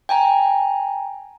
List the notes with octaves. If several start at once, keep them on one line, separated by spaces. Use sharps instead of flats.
G5 G#5 A#5